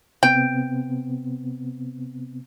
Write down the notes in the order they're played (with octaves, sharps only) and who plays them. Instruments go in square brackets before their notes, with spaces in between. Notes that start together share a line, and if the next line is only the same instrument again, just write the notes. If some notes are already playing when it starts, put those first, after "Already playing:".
[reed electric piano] C3 B3 C4 [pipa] G5